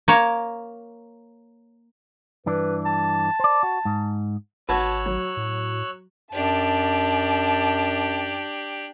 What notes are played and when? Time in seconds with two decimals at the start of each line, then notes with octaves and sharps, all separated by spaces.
0.08 A#3 A#4 C#5
2.46 G2 E3 D4 B4
2.85 A5
3.40 C5 D5
3.63 F#4
3.85 G#2
4.69 G#1 F#4 B4 C#5 A5 E6 F#6 G#6
5.06 F#3
5.37 A2
6.33 F#2 D4 G4 A5